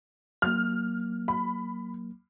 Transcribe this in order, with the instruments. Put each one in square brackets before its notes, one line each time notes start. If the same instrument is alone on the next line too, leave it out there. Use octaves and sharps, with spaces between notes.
[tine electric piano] F#3 A#3 [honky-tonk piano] F6
[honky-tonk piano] B5